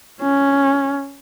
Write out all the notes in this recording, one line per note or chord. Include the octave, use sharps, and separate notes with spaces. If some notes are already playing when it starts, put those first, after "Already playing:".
C#4